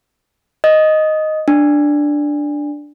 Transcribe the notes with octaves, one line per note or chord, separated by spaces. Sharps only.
D#5
D4